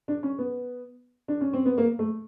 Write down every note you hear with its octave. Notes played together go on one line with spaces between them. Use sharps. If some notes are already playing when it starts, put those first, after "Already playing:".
D4
C#4
B3
D4
C#4
C4
B3
A#3
A3